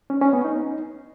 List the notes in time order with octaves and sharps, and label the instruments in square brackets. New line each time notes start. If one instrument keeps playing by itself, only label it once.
[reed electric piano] C#4
C#4
B3
D#4